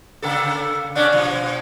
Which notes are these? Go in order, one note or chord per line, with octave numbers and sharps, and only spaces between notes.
C#3 A#3 A4
C3 C#4 D4
B2 F3